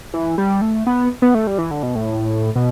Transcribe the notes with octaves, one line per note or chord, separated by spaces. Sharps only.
E3
G3
A3
B3
B3
A3
G3
E3
D3
B2
A2
B2